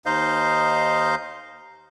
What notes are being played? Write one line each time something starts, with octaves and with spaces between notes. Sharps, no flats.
D#2 D#4 C5 D#5 F5 G6